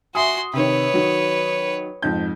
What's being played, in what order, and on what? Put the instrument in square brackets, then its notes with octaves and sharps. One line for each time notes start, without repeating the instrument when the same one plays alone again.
[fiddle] F#4 C6 [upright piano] E5 G#5 D#6
[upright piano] C3 D#3 [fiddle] B4 C#5
[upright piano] D#3 F#3
F2 G#2 G6